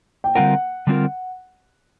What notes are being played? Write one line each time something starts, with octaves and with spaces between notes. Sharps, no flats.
G5
D3 G3 C4 F4 A#4 F#5
D3 G3 C4 F4 A#4